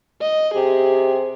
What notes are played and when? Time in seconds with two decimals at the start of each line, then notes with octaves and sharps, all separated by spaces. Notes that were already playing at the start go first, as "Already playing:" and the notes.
0.21 D#5
0.54 C3 G4 G#4